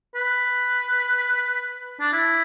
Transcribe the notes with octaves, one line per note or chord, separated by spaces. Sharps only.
B4
D4
E4